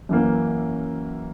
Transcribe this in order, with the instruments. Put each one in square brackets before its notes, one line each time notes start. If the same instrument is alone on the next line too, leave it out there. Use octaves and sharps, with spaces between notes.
[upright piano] F#2 E3 A#3